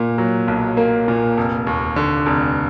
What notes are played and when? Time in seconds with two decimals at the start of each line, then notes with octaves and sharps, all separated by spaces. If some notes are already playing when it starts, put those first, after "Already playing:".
Already playing: A#2 A#3
0.18 F#3
0.48 B1
0.77 A#3
1.08 A#2
1.37 F1
1.67 D#2
1.96 D3
2.26 F1